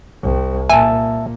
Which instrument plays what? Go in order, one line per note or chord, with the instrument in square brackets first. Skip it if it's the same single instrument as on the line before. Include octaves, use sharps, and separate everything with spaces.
[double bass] C2
[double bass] A#2 [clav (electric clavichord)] E5 A5 [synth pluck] G#5